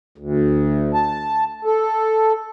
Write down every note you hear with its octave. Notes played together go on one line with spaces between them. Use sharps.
D2
A5
A4